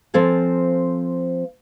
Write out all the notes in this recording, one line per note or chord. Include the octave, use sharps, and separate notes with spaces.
F3 C4 A4 F5 G#5